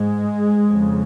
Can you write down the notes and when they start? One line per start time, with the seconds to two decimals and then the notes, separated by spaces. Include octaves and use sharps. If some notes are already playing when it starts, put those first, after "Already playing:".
Already playing: G#2 G#3
0.69 F2 C#3